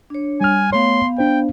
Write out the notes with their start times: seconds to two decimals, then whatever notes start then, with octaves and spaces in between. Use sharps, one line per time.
0.10 D4 C#5
0.41 G3 G#5 F6
0.73 A3 B3 C#5 F5 C6
1.18 D4 C5 G5